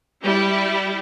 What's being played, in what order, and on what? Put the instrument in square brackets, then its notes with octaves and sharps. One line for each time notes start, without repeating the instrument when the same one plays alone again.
[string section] G3 E4